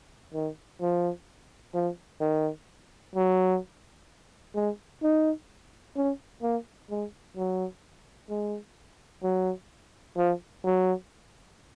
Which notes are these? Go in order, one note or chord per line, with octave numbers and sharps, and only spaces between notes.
D#3
F3
F3
D#3
F#3
G#3
D#4
C#4
A#3
G#3
F#3
G#3
F#3
F3
F#3